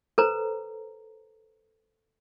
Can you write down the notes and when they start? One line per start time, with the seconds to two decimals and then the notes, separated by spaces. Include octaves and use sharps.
0.18 A4 B4 C5 A#5